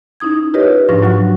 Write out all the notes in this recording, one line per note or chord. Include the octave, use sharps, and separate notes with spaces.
C#4 D#4 E4 D#6 G#6
F4 G4 A#4 B4 C#5 D#5
G#2 F3 D4 F4 C#6 A#6
F#3 F#4 F#5 C#6